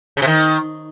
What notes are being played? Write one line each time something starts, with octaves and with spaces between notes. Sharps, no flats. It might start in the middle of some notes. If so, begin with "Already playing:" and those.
C#3
C3
D#3